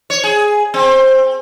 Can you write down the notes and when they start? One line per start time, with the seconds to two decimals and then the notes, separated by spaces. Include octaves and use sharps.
0.10 C#5
0.24 G#4
0.74 C4